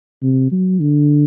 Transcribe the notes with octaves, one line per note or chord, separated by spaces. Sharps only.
C3
F#3
D3